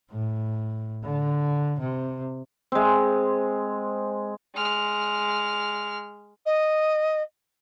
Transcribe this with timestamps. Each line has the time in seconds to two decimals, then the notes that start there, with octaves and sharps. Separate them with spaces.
0.11 A2
1.04 D3
1.80 C3
2.72 G#3 C4
4.55 G#3 F6
6.46 D#5